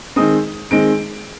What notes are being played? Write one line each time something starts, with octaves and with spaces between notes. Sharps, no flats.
D#3 G#3 C4 D#6
D#3 G#3 C4 D7